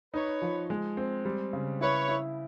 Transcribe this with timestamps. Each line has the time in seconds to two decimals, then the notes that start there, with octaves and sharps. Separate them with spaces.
0.14 D#4 B4 C#5
0.42 F3
0.70 G#3
0.97 C4
1.25 G3
1.53 C#3
1.81 E4 B4 C#5
2.09 E4